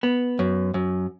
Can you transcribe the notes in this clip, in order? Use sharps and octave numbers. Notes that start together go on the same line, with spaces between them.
B3
F#2
F#2